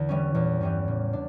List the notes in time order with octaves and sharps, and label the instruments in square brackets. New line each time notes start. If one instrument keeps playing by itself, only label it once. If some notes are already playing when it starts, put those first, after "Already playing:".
Already playing: [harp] E2 [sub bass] D3
[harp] E3 G3 C#4
[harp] E2 [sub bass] A#2
[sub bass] G2 [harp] E3 G3 C#4
[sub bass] A2 [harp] C#3
[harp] D4